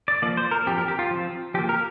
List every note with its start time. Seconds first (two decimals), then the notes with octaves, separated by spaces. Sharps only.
0.08 D5
0.22 F3 A#3 D5
0.37 C5
0.51 A#4
0.66 F3 C4 G4
0.78 A#4
0.88 G4
0.99 F4
1.11 F3 C4
1.54 F3 G4
1.59 A#3
1.69 A#4